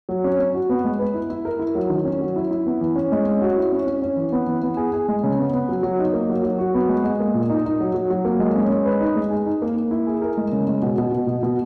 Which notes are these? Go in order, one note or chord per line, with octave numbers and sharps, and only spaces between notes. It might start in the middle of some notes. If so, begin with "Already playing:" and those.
F#3
C#4
C#4
F#4
B3
G#3
B4
E4
E4
A#4
E4
F#3
D#3
C#4
F#3
E4
E4
B3
E3
C#4
G#3
C#4
F#4
E4
C#4
C#4
C#4
E3
B3
E3
B3
G#4
G#4
G#3
C#3
B3
B3
F#3
F#3
D#4
A#3
F#3
F#3
F#4
B3
G#3
G#3
A#3
A#2
D#4
D#4
F#3
F#3
F#3
A#3
G#3
C#4
G#3
B4
D#4
G#3
G#4
D#4
A#3
A#3
E4
G#4
A#4
G#3
C#3
G#3
B2
B2
B2
B2
B2